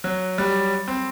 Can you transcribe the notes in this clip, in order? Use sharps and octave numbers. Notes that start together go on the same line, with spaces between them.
F#3
G3
C4